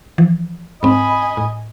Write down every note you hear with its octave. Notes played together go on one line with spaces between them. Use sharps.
E3 F3
G#2 C4 D#5 G#5 B5
A2